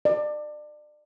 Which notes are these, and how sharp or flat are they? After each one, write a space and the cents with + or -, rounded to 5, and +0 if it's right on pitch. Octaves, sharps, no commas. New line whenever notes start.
D5 +30